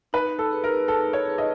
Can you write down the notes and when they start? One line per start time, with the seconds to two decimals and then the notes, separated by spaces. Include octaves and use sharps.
0.13 D#4 B4
0.39 A4
0.51 G#4 B4
0.64 A#4
0.88 D#4 A4
1.13 C#5
1.25 G#4 B4
1.38 D#5